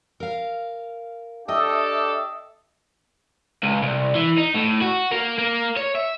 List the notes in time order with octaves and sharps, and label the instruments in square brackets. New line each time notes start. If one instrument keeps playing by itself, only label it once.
[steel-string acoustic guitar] A#4 F5
[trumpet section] D4 G4 A4 [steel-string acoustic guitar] D#5 G5 [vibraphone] E5 D#6 E6
[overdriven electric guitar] C#2
C2
E3
D#4
A2
F#4
A#3
A#3
C#5
E5